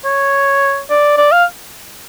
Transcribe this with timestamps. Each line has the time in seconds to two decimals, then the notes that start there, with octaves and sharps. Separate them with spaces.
0.05 C#5
0.90 D5
1.17 D5
1.32 F5